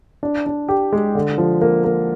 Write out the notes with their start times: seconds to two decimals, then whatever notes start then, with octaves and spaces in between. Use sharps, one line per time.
0.23 D4
0.46 D4
0.68 G4
0.93 G#3
1.15 D3
1.38 F3
1.62 A#3
1.84 A#3